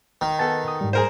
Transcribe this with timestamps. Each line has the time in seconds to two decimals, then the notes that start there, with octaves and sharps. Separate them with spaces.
0.21 D#3
0.39 B3 A4 G#5 A5 A6
0.68 D#6
0.81 G#2 G3
0.93 G#4 A#4 C5